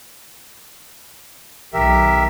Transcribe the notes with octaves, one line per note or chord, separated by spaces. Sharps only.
B1 D#3 G4 A#4 E5